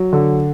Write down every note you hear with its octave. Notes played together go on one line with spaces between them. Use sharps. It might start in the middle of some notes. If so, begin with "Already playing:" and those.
Already playing: F#3
D3